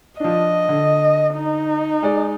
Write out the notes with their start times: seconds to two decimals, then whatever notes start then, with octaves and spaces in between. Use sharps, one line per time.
0.20 F3 D4 D#5
0.69 D3
1.36 D#4
2.03 G#3 D5